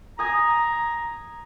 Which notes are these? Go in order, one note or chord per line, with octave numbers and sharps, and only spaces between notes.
G#5 A#5 D#6